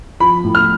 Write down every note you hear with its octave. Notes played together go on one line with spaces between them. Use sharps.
F3 B5
A2
F6